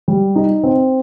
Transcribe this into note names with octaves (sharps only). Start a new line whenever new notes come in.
G3
D#4
C4